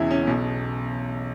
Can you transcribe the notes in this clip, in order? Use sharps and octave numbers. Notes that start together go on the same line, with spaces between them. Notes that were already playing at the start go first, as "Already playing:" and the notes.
Already playing: E1 E2 C#3 C#4 E4
C#4
B1 B2